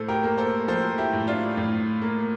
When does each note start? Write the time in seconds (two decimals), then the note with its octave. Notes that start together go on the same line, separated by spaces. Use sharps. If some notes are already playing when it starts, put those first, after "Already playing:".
Already playing: A2 A4 C5
0.08 G4 A#4
0.24 A#3
0.38 A4 C5
0.68 F3 A4 C5
0.98 E4 G4
1.13 A2
1.27 D4 F4
1.57 A2
2.02 A#3